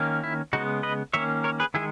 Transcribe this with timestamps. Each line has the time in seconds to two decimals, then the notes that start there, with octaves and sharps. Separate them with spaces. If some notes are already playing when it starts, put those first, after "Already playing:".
Already playing: D#3 A#3 C#4
0.24 E4
0.53 C#3 G#3 B3 D#4 F#4
0.83 B4 D#5
1.13 D#3 A#3 C#4 C#5 E5
1.44 A#4 C#5
1.60 G#4 B4
1.74 D#3 G#3 E4 G#4